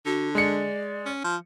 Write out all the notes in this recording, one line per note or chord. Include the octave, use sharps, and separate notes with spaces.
D3 F#4
G#3 D5 C#7
C#4
F3